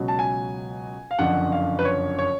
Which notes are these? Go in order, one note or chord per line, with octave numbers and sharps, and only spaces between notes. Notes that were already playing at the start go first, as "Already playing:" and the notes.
Already playing: C#2 B2 F#3
A5
G#5
F5
F#1 F2 D3 F3 F#5
F5
B4
C#5
C#5